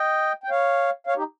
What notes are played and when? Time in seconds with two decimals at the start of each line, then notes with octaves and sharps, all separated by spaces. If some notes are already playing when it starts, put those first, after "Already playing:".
Already playing: D#5 G5
0.44 G5
0.50 C#5 F5
1.07 C#5 F5
1.16 D#4 G4